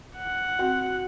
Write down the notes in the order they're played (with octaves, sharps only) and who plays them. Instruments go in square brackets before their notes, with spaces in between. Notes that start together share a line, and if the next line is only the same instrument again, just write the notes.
[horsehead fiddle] F#5
[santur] C4 F#4